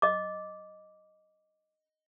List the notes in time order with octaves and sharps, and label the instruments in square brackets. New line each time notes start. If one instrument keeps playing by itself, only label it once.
[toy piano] D#5 D6